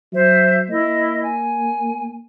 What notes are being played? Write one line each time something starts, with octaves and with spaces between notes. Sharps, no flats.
F#3 C5 E5
A#3 E4 D#5
G#5